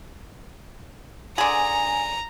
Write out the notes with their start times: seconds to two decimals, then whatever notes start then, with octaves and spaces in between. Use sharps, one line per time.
1.38 D3 G#4 G#5 A#5